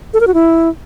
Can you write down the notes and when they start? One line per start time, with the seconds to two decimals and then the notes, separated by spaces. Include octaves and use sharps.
0.14 A4
0.20 A#4
0.27 F#4
0.34 E4